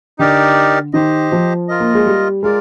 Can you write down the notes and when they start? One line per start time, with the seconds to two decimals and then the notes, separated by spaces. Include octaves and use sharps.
0.19 D3 D#4 G4 A#4 D5
0.93 D#3 G4 C5 D#5
1.32 F3
1.68 F4 A#4 D#5
1.80 A#3
1.94 G#3
2.06 G3
2.43 G#3 F4 A#4 D5